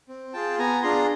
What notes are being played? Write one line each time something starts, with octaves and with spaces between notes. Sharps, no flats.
C4
F4 G#4 G5 A5
B3 G#5 A#5
D4 F4 G#4 A#5 C6